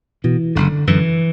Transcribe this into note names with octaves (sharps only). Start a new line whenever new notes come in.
B2 E3
F#1 D3
F#2 D3 E3